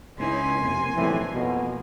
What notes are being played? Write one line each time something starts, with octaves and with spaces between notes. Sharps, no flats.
C#2 C#4 D#4 E4 G#5 C6
F2 C3 A#3
B1 A2 E3 F3 G3 C4
F2 B2 A#3